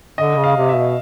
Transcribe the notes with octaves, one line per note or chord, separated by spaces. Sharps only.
D3 D#5
C#3
F5
C3
E5
B2